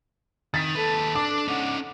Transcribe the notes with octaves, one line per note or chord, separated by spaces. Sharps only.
D#3 A6 B6
D#2 A4 B4
D4 D6
C#4 D#4 F#5